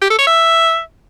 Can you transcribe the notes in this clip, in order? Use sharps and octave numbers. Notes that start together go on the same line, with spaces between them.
G4
A4
C#5
E5